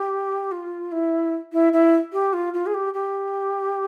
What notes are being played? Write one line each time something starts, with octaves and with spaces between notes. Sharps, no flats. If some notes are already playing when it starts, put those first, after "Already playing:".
Already playing: G4
F4
E4
E4
E4
G4
F4
F4
G#4
G4
G4